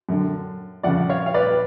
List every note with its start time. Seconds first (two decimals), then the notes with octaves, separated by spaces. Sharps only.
0.09 F#2 D3
0.83 F2 C#3 D5 F#5
1.09 C#5 F5
1.26 F5
1.34 B4 D5
1.51 B4